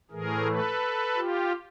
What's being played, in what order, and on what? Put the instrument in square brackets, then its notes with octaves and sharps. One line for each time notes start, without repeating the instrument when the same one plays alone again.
[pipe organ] A2 E3 A3 G#4 A#4
A4 B4
F4 G4